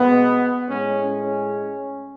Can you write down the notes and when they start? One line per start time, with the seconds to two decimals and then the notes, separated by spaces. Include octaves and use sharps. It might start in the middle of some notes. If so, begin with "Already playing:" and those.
Already playing: B2 G#3 B3
0.67 A2 G#3 C#4
1.02 C#4